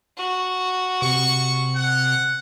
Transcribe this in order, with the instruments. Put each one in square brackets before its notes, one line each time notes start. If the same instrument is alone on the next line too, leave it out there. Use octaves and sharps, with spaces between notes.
[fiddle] F#4
[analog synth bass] C3 [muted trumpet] C#6
[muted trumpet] F#5